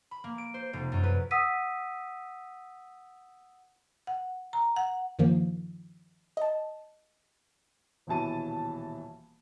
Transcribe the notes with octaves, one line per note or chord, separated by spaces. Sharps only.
B5
A#3
D7
C5
F1
F#2
B4
F#5 D#6 E6 B6 D#7
F#5
A#5
F#5
G2 D#3 F3 A#3
D#5 A5
D#1 B2 E3 A5 D#7